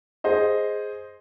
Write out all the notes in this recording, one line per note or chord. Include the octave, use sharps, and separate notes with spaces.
G#4 C5 D#5